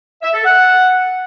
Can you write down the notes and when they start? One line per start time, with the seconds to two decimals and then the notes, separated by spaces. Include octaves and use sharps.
0.22 E5
0.34 A4
0.45 F#5